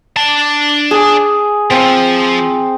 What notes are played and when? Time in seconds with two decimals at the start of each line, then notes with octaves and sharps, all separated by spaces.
0.17 D4 A5
0.91 G#4
1.70 F3 C4